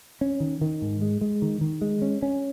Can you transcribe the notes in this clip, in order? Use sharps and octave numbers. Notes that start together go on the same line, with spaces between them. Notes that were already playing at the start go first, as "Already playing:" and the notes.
C#4
D#3
D#3
G#2
G#3
G#3
D#3
D#3
G#3
C#4
C#4